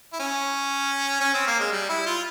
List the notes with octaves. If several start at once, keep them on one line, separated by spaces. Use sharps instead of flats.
E4
C#4
C#4
C4
A#3
G#3
G3
E4
F4